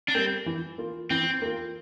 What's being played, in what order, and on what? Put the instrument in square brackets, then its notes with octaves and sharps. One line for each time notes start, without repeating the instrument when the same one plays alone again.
[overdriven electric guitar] D4
[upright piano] G3 A#3 [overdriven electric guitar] C4
[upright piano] E3
A#3 F4
[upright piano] E3 [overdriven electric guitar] C4
[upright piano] A#3 F4